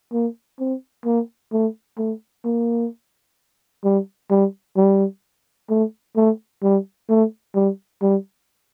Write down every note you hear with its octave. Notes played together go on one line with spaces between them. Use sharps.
A#3
C4
A#3
A3
A3
A#3
G3
G3
G3
A3
A3
G3
A3
G3
G3